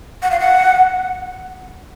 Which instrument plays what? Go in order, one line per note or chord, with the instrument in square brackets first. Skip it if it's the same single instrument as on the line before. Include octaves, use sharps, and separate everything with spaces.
[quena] F#5
F5
F#5